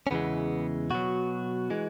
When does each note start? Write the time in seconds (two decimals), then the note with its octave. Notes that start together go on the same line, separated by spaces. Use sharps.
0.07 C#4
0.11 E2 C#3 E3 G#3 B3
0.90 B2 F#3 F#4
1.70 E3 G#3